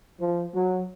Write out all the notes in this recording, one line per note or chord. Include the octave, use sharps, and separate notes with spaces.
F3
F#3